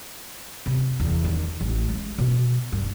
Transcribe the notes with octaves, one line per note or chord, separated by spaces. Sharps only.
C3
E2
D#3
A1
G#3
B2
G2